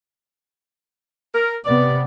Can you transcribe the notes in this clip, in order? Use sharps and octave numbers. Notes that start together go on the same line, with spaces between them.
A#4
C3 B3 D5